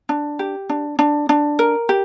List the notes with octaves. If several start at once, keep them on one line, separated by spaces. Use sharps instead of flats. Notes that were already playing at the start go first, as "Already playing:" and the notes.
D4
G4
D4
D4
D4
A#4
G4